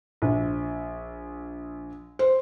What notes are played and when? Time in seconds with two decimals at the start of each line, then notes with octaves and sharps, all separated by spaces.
0.22 A#1
2.19 C5